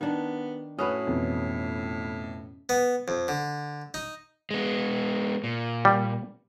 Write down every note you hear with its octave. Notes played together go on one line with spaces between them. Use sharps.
D#3 B3 D4
A2 C#4 F#4 B4 D#6
F2 B2 E3
B3
F2
D3
D#4
G#3 B3
A#2
G3